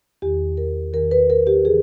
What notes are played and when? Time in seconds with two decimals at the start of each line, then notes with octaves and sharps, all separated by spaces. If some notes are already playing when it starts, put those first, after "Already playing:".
0.22 E2 D#3 G4
0.57 A#4
0.93 E2 D#3 A#4
1.11 B4
1.30 A#4
1.47 G4
1.65 C#3 E3 G#4